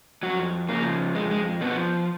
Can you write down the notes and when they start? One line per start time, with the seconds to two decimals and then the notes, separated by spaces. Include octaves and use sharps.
0.23 F2 F#3 F#4
0.69 C#3 F3 A#3
1.15 F2 G#3
1.31 G#3
1.61 B2 F3 B3